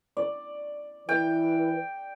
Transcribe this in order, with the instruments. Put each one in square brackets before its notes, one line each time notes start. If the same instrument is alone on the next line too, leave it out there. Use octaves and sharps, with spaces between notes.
[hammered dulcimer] D5
[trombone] E3 [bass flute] B4 [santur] G5